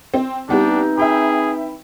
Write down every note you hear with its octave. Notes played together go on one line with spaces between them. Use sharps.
C4
E3 G3 B3 C4 D4 D#4 G4
G#4 E5 G5 B5